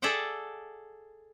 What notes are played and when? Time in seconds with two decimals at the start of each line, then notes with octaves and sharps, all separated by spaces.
0.02 G#4 A4 D5 E5 F#5 G5